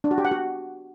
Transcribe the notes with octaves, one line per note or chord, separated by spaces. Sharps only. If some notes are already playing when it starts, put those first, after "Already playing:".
D4
F#4
G4
F#5
F#4